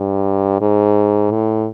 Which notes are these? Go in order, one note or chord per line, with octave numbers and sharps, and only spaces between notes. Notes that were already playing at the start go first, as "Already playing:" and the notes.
Already playing: G2
G#2
A2